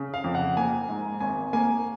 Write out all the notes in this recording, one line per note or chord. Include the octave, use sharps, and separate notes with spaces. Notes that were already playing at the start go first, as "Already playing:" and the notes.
Already playing: C#3
F5
F2
F#5
A#3 G#5
G#2
G#1 G#5
A#3 G#5